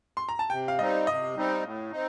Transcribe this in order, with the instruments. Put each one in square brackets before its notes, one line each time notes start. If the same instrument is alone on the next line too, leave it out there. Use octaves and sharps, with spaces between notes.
[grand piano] C6
A#5
A5
[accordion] C3 [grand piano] G5
[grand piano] F5
[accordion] G3 C4 D#4 [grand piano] D#5
[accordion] C3 [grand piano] D#5
[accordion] G3 C4 D#4
A2
C4 D#4